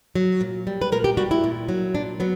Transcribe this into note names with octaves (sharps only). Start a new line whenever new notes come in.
F#3
A#2
G3
B4
A#2 A#4
G4
G3 F#4
E4
A#2
F#3
A#2 D4
F#3 B3